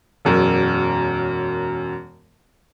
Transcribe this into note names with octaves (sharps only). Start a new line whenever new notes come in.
E1 F#2 A#4